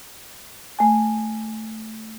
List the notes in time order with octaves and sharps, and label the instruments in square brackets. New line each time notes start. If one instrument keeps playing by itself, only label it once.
[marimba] A3 G#5